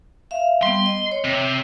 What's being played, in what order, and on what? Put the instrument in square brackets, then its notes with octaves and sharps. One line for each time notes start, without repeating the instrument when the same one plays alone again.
[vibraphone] E5 F5
[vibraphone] G3 B3 [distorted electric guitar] C6
[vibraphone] D#5
C#5
[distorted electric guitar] C3